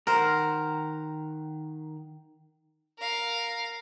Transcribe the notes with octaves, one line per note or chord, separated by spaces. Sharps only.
D#3 A#4 C5 F#5 A#5
A#4 F5